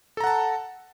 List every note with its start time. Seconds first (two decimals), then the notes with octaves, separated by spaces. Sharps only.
0.17 A4
0.20 A#5
0.24 F#5
0.27 A5